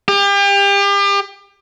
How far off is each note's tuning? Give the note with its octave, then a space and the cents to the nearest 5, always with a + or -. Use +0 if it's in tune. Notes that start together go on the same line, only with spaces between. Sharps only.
G4 +35